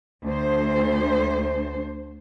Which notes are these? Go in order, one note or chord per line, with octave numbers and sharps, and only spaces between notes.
D2 C5